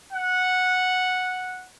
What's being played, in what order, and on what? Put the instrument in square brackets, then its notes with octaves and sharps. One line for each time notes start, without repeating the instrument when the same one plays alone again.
[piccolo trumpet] F#5